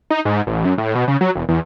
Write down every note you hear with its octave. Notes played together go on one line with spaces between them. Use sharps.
D#4
G#2
A1
F#2
A2
B2
C#3
F#3
E1
E2